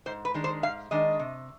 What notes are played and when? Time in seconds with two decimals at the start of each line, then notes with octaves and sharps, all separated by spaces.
0.06 G#2 C5
0.25 B4
0.34 D#3 G#3 D4
0.44 C5
0.63 G#2 F5
0.91 D#3 G#3 D4 D#5
1.19 C3